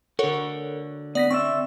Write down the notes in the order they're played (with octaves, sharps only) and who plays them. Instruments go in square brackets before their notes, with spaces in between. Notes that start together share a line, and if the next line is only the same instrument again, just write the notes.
[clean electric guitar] D3 F#4 [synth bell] A4 A#4 C#5
[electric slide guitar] B3 [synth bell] D5 A#6 B6
[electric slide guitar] C4 D5 E5 [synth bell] C#6